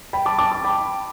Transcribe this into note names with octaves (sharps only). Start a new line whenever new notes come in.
G5 B5
A5 D6
A5 D6
A5 D6
G5 B5